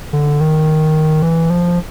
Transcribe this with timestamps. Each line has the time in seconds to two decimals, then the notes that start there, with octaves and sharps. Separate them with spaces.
0.13 D3
0.41 D#3
1.22 E3
1.50 F3